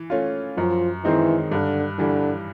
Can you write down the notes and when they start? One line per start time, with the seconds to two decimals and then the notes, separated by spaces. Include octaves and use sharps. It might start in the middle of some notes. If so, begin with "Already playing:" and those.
Already playing: E3
0.10 A3 C#4 F4
0.57 F#2 F3
1.04 D#3 E3 G#3 C4 D#4
1.51 G2 D3
1.98 D3 E3 G3